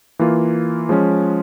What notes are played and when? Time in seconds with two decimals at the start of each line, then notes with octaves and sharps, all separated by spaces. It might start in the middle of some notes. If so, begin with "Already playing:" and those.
0.19 E3 A#3 F4
0.89 F3 G#3 C#4